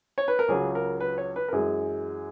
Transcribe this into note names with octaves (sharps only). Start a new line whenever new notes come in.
C#5
B4
A#4
C#2 C#3 F#3 G#4
A#4
B4
C#5
B4
A#4
F#2 E3 G#3 G#4